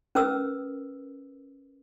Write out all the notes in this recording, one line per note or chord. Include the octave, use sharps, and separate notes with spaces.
C#4 A#4 B4 D#6 E6